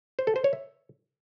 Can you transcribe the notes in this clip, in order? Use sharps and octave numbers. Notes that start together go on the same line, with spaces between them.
C5
A4
C5
C#5
E5